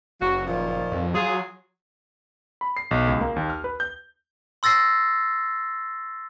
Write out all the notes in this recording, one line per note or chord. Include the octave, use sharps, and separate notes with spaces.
F#1 F#3 F#4
A#2 D#3 F3
F2
F#3 F4 G#4
B5
C7
B1
C#2
A#3
D#2
F6
B4
G6
C6 E6 A6 A#6 C7